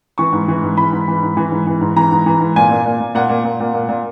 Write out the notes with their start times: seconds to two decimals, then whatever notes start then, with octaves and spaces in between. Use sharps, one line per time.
0.18 E3 C#6
0.32 G#2
0.48 E3
0.63 G#2
0.77 E3 B5
0.93 G#2
1.08 E3
1.23 G#2
1.37 E3
1.52 G#2
1.67 E3
1.81 G#2
1.96 E3 A#5
2.12 G#2
2.26 E3
2.40 G#2
2.56 A#2 G#5
2.71 A#2
2.85 A#2
3.00 A#2
3.15 A#2 F#5
3.29 A#2
3.44 A#2
3.60 A#2
3.74 A#2
3.89 A#2